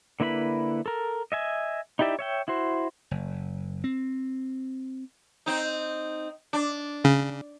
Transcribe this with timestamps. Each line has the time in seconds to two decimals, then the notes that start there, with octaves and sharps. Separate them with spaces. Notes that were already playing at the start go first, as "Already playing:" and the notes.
0.20 D3 A#3 E4 B4 B5
0.86 A4 A#4
1.32 D#5 E5 G#5
1.99 D#4 E4 G4 D5 E5
2.19 C#5 E5 G5
2.48 E4 F#4 C5
3.11 F#1
3.84 C4
5.46 C4 D#4
6.53 D4
7.04 C#3